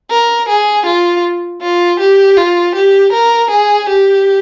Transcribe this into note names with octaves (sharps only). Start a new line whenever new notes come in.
A#4
G#4
F4
F4
G4
F4
G4
A#4
G#4
G4